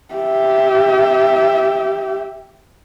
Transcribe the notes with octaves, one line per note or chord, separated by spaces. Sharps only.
G4 E5